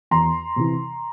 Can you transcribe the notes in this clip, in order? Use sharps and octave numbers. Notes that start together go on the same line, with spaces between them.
E2 A#5 C6
C3 E3